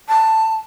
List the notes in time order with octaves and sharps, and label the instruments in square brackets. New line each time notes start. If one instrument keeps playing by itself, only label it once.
[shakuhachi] A5